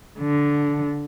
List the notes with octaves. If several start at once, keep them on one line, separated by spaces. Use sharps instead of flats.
D3